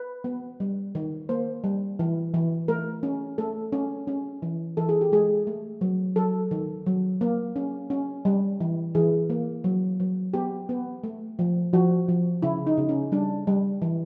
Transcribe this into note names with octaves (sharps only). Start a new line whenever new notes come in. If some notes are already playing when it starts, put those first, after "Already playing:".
Already playing: B4
B3
G3
D#3
A#3 C5
G3
E3
E3
A3 A#4
C#4
A3 A4
C#4
C#4
E3
E3 A4
G#4
G4
G#3 G#4
A3
F#3
F#3 A4
D#3
F#3
A#3
C#4
C#4
G3
E3
E3 G#4
A#3
F#3
F#3
B3 G4
B3
A3
F3
F3 F#4
F3
C#3 E4
D#4
C#3
C#4
G3 D4
G3
E3